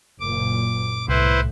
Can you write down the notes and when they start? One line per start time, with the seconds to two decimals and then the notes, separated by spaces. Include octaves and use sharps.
0.20 F#1 A#2 D6
1.08 C2 A2 E4 B4 C5